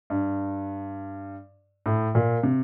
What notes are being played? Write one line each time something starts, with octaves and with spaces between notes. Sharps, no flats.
G2
A2
A#2
C3